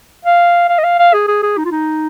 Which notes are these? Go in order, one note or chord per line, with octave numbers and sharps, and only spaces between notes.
F5
F5
D#5
F5
F5
G#4
G#4
G#4
D#4
F4
D#4